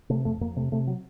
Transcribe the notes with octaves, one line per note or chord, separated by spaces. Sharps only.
C3 A3
F2 A3
F2 A#3
C3 A3
C3 A3
F#3